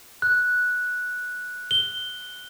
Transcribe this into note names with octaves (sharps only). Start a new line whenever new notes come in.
F#6
G7